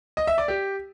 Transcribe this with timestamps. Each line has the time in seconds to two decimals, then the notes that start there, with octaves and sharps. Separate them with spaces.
0.17 D#5
0.27 E5
0.38 D5
0.48 G4